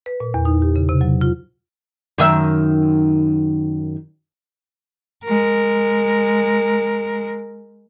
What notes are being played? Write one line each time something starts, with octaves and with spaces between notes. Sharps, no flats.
B4
A#2
E2
D#4
G4
C#3
C3
F#3
F4
F#2 D#3 E5
G#3 A#4